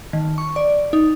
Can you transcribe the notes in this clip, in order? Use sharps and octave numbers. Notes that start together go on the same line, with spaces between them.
D#3
C#6
D5
D#4